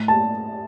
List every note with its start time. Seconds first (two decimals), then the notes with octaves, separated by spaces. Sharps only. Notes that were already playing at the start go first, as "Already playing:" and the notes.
Already playing: A2
0.08 A5